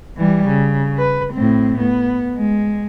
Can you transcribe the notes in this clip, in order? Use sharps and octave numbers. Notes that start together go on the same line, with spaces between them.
E3 G3
C#3
B4
A2 C4
B3
G#3